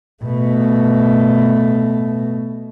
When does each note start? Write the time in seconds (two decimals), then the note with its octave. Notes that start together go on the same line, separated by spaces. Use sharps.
0.23 B2 A3